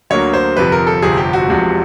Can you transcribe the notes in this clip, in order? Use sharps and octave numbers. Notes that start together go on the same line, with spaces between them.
D2 D3 F#3 A#3 C#5
C5
G1 F2 C3 F3 B4
A#4
A4
G1 F2 C3 F3 G#4
G4
F#4
F1 E2 C3 F3 G#3